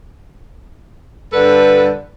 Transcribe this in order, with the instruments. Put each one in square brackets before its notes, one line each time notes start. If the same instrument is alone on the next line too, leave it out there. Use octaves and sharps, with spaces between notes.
[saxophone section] G2 D3 A4 B4